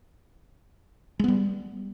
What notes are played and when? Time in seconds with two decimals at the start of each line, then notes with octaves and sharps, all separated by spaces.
1.19 G#3
1.24 B3
1.28 G3